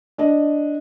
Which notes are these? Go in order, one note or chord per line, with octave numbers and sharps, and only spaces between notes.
D4 D#5